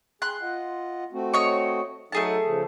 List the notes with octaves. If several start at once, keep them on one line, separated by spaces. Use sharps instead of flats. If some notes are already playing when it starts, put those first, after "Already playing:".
G#4 C6 F#6
F4 D#5 F#5
A3 C4 F#4
C#5 D#5 C#6
F#3 A3 D#4 G#4 A4 A5
C#3 F3